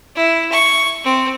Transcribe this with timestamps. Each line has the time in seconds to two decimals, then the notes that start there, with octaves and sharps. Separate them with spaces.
0.16 E4
0.52 C#6
1.04 C4